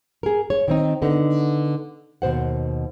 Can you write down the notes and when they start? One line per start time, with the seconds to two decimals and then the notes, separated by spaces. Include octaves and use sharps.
0.23 G#4 A#4
0.50 C#5
0.68 D#3 C4 D#4
1.02 D3 B3 D#4
2.22 D#2 B2 C5 F#5